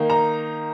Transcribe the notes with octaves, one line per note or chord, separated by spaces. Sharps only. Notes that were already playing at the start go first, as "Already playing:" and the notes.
Already playing: D#3 A#3 D#4
A#5